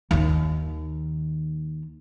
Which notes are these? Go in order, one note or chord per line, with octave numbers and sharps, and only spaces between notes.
D#2 D#3